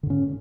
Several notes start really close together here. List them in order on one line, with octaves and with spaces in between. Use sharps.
D3 G#2 C#4